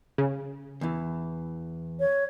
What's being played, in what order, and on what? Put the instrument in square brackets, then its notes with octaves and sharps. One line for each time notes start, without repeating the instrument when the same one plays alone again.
[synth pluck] C#3
[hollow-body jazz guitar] E2 E3
[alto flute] C#5